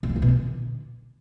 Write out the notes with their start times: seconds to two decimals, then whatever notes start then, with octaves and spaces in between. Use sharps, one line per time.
0.03 C3
0.09 C#3
0.16 E2
0.22 B2
0.28 D3